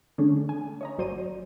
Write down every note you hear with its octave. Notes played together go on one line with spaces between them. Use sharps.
D3 G#3 A3 C#4 D4
G#5
C#5 D#5 A#5
G#1 F#3 C5 D5 D#7